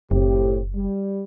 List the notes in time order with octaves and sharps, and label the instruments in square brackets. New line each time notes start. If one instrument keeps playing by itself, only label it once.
[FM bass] F#1 [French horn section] A2 C4 G4
[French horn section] G3